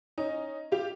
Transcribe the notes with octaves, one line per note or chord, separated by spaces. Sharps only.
C#4 D#4
F4 G4